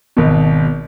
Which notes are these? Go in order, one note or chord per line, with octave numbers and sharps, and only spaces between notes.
G#1 B2